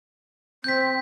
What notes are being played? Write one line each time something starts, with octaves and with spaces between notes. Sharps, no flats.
C4 G6 B6